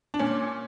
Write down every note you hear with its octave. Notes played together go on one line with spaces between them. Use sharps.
D4
A#2 C#4